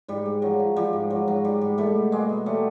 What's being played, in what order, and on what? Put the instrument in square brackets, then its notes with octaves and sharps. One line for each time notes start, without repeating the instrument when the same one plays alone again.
[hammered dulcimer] G#2 G3
G#2
F3 F#3
F3
F3 G3
G#2
F3 F#3
G#2 F#3
G#2 G3
G#2 G3
B2 G3 A3
B2
B2 G#3 A#3
B2
F#3 G3 A3